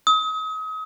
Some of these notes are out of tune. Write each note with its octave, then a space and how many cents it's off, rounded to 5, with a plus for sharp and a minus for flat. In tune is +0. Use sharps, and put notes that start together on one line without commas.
D#6 +35